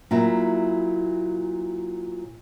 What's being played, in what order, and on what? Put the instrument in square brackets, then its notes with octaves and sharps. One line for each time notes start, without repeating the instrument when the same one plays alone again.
[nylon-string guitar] A#2 F#3 E4